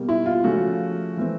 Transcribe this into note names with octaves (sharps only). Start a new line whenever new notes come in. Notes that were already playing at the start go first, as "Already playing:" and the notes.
Already playing: B2 G3 A#3
E4
F4
C#3 F3 A3 C#4 F#4
E3 A3 C4